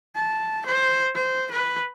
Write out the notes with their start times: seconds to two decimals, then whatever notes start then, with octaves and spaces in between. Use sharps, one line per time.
0.15 A5
0.66 C5
1.15 C5
1.51 B4